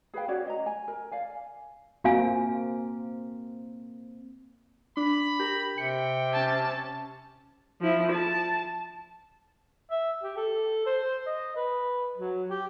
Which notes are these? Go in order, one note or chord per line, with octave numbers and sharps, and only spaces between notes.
G#4 B4 F5 G5
C#4 F#4 C#5 D5
D#5 A#5
G#5
A#4
D5 F5 G#5
A#3 C4 F#4 F5 G#5
D4 B5
G4 A#4
C3 G5 C#7
C#4 A5
F3 E4
A5
E5
G4
A4
C5
D#5
B4
F#3
G4